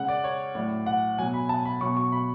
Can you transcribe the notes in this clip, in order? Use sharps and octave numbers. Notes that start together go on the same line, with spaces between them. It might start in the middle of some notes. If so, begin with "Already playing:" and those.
Already playing: C#3 G#3 F#5
D5
C#5
A2 F#3 D5
F#5
B2 F#3 G#5
B5
A5
B5
B2 F#3 C#6
C#6
B5